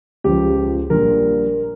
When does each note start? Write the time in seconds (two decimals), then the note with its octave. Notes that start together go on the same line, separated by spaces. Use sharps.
0.24 C#2 C#3 F3 G4
0.90 A#1 A#2 G3 A#4